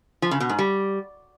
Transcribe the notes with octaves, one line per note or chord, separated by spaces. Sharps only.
F3
C#3
B2
G#2
G3